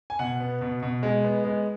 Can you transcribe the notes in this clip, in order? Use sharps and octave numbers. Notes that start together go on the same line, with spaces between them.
G#5
B2 F#5
B3
B2
B2
G#3
B3
G#3